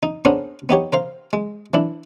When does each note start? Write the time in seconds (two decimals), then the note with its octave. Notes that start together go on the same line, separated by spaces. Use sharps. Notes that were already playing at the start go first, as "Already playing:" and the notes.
0.03 D#4
0.25 B3 C#4 D4 G#4 A#4 C5
0.69 B3 D#4 G4 C#5
0.93 A#4 C5 F5
1.33 G#3
1.74 E3 D4 E4